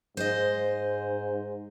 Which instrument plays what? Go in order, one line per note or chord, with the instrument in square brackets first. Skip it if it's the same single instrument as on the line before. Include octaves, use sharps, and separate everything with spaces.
[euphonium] G#2 [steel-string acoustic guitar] C5 D#5